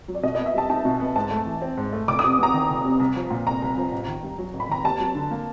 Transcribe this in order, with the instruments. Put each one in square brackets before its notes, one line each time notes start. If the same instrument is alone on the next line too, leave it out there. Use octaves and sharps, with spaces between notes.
[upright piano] F#3
[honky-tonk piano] D5
[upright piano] B2 [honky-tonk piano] D#5
[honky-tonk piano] D#5
[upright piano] B3
[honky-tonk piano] E5
[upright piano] G3 [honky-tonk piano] A5
[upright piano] D#4 [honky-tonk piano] A5
[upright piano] B2
B3
[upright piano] G#2 [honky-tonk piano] A5
[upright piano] A3
E3
C4
G#2
A3
[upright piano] F1 [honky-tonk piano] D6
[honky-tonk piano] D#6
[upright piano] C3
[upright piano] E2 [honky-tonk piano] A#5
[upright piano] D#3
F1
C3
C2
F3
A#2
[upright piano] C2 [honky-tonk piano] A#5
[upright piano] C2
F3
A1
D#3
G2
F#3
A1
[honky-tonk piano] B5
[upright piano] D#3 [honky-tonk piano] A#5
[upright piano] D#2 [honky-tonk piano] A5
[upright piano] F#3
D3
A#3